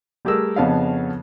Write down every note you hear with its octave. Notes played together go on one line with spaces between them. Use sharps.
G3 A3 G4 G#4 A#4 E6
F2 C#3 B3 C#4 D4 F5